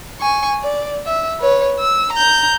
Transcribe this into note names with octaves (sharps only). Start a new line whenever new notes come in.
G#5 C#6
D5
E5
B4 C#5
E6
A#5 G6